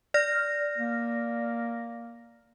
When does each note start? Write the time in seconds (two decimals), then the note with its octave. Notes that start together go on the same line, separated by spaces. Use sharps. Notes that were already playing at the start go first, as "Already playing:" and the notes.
0.14 D5 F6 A#6
0.78 A#3